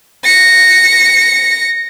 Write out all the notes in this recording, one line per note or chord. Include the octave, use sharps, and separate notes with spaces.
A#6 C#7